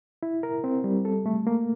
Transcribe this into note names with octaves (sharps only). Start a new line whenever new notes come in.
E4
A#4
C4
G3
A4
A3
A#3